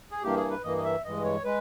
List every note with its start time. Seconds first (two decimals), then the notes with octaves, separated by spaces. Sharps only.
0.11 G#4
0.23 G2 E3 A#3 G4
0.36 G#4
0.50 B4
0.63 G2 E3 A#3 D#5
0.77 D#5
0.84 E5
1.04 G2 E3 G#3 D#5
1.24 C#5
1.44 G#3 B4